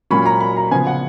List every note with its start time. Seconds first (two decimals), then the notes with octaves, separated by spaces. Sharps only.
0.11 A#2 F#3 C#4 B5
0.26 A#5
0.41 B5
0.57 A#5
0.71 C#3 F3 B3 G#5
0.87 F#5